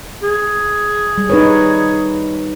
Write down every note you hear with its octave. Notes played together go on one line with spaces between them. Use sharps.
G#4
G3
D#4 B4 C#5